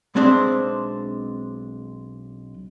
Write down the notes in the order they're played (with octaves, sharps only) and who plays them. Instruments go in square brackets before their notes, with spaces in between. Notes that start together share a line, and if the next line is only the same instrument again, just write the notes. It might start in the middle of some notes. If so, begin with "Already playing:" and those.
[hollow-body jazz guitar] B1 G#3 C4 D4 C5 E5